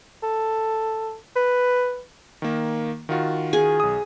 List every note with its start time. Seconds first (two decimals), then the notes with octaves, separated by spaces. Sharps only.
0.23 A4
1.36 B4
2.42 D#3 A#3
3.09 D#3 F4 F#4
3.53 G#4
3.80 B1 D#6